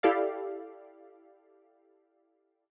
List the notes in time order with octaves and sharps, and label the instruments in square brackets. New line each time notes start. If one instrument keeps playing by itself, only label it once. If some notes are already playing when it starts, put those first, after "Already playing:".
[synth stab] E4 G4 A4 D5 F5